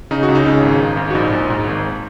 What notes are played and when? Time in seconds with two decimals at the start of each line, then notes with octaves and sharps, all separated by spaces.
0.11 C#3 D#4
0.23 F#4
0.28 C#2
0.35 D#4
0.46 C#3
0.63 G#1
0.80 G#1
0.97 G#2
1.10 F#4
1.14 A#1 D#4
1.32 A#1
1.50 G#2
1.67 G#1